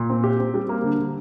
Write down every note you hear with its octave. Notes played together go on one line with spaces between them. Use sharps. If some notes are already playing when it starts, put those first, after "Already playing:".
Already playing: A#2
C4
G4
C4
G3
A#3
D3
D3